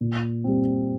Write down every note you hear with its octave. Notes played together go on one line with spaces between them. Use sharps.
A#2
G3 C4